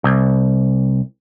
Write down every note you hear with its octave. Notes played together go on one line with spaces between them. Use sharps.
C2